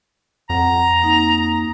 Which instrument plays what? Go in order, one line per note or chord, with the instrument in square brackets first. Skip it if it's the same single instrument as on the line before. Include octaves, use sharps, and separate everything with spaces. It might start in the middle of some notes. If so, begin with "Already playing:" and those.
[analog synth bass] F2 [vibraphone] F#5 [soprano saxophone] A#5
[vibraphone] A#3 D#4